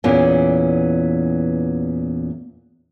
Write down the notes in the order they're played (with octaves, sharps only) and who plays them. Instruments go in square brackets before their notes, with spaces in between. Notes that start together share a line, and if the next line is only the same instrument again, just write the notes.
[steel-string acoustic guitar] E2 A#2 E3 B3 C#4